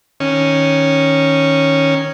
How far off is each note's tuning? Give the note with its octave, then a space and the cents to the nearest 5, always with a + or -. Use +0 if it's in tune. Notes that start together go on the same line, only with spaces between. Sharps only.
D#3 +0 C#4 -5